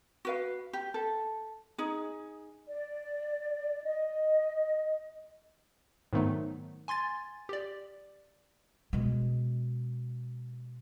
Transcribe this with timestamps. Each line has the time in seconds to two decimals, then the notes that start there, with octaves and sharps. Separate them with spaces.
0.25 F#4 B4 F5
0.73 G4
0.94 A4
1.78 D#4 G#4
2.68 D5
3.85 D#5
6.13 G#2 D#3 F#3 A3 B3 D#4
6.88 G#5 C6 G#6 A6
7.49 G4 D5
8.93 B2 G#3